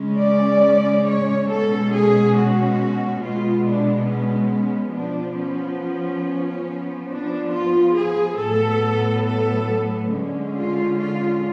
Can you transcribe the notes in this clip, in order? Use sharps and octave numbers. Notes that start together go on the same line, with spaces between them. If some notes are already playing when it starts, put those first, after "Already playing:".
Already playing: C#3 G#3 C#4
D5
C#5
B2 G#3 C#4 A4
G#4
F#4
B2 G#3 B3 F4
D4
C#4
C#4
F3 B3 D4
C#4
C#4
F3 B3
D4
F4
G#4
A2 F#3 B3 A4
A4
D3 G#3 C#4
F4
F4